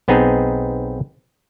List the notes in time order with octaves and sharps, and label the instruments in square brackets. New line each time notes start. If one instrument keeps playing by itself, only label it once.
[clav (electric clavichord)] B1 B3 C4 D#4 G#4